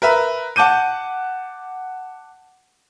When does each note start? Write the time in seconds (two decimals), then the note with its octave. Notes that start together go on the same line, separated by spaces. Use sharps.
0.02 A#4 B4 E5
0.56 F#5 A5 D6 G6 D#7